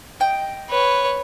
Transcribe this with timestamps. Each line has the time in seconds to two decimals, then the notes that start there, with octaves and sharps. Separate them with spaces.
0.20 D#5 G5
0.70 B4 C#5